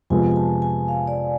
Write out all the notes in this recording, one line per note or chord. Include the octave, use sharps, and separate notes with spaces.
F2 C3 F3 G#3 B3 G#5
G#5
A5
G#5
F5
D5